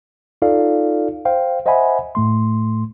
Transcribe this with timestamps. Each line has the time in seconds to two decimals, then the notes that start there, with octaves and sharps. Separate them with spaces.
0.42 D#4 F4 A4 D5 F5
1.25 C5 F5 G5
1.66 C5 D#5 E5 F#5 G#5 B5
2.15 A2 A3 C6